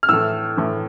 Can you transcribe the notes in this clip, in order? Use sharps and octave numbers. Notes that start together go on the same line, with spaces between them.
F6
A2 E3 A3 E6
A2 E3 A3